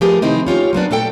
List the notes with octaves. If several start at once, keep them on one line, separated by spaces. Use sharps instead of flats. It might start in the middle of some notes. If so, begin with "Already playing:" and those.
F3 A3 G4 G#4 A#4 B4
C3 D#3 A3 C4 D#4 E4
C#4 F4 G4 C#5
F#3 A#3 B3 D4
A#2 A3 A4 G5